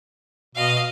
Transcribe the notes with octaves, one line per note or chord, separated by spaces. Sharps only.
B2 D#5 F5